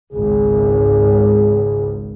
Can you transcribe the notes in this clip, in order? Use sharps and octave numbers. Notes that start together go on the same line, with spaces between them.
G#1 C#2 G#4